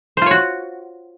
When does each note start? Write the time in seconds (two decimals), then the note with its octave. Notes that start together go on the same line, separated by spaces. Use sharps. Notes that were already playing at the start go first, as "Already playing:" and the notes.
0.17 C5
0.22 F4
0.26 C#5
0.31 F#4